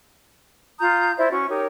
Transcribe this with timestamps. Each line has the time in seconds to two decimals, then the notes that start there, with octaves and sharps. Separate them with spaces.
0.80 F4 A#5 D#6 G6
1.18 E4 C5 D5 E5
1.32 C#4 F#4 C#6
1.49 D#4 G4 A#4 C#5